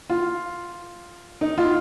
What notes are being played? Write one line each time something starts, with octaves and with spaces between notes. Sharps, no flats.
F4
D#4
F4